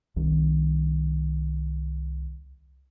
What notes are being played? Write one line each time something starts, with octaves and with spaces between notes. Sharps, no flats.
C2 D#3